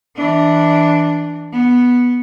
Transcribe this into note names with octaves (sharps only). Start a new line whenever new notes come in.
E3 D4
B3